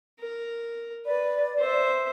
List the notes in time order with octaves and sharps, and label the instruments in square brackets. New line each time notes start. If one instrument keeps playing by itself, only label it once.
[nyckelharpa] A#4
[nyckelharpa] B4 [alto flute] D5
[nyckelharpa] C5 E5